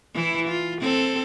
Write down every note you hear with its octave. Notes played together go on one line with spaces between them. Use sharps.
E3 E4
F4
C4 A4